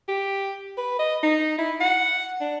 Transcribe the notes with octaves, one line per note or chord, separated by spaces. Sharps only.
G4
B4
D#5
D#4
E4
F#5
D4